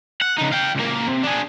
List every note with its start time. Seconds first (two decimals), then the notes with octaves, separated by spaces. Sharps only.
0.22 F#5
0.38 C#3 D#4
0.52 F5 G5
0.75 C#2 A#3
1.07 C3
1.23 D4 G#4